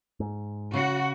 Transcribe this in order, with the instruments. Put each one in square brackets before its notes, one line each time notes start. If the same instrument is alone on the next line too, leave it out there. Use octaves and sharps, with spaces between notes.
[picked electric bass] G#2
[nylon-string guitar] C#3 [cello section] F#4